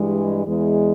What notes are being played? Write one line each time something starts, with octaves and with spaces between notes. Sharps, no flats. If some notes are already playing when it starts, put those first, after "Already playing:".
Already playing: G2 E3 G3 G#3
E2 E3 G#3